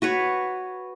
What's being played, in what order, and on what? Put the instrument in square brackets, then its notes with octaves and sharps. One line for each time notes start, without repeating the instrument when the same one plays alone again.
[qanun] F#4 B4 C#5